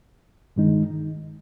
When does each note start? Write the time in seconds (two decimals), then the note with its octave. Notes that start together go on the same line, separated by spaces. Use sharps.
0.56 G2 D#3 G#3 D#4